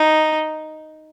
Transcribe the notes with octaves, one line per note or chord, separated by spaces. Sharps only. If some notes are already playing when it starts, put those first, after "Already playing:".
Already playing: D#4